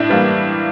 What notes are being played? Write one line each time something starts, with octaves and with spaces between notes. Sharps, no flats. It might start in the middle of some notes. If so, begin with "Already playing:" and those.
Already playing: A2 D4 E4
E3 G3 A#3